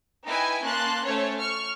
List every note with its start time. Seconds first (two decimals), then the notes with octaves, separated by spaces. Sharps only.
0.25 D#4 E4 B4 G5 G#5
0.64 A#3 C#4 A5 C6 F#6
1.04 A3 C#4 A4 C5 C#5
1.37 C#6 F6